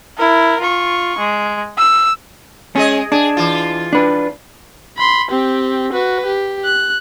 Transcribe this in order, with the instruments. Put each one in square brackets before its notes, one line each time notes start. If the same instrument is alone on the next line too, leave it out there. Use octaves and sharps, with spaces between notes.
[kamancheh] E4 A#4
F4 C#6
G#3
E6
[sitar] G#3 G#4 D#5 [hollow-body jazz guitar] C#4
[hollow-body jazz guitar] D4 [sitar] G#4
[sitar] E3 F4
[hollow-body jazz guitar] D4 B4
[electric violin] B5 C6
C4 G4
F#4 B4
G4
F#6